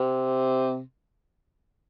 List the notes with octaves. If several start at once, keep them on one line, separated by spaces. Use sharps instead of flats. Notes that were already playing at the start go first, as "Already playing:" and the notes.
Already playing: C3